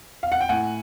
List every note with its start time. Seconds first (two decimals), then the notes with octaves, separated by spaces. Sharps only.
0.23 F5
0.32 F#5
0.41 G5
0.49 A2 F#5 G#5